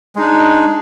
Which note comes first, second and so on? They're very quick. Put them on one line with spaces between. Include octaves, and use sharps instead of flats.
G#3 D#4 D4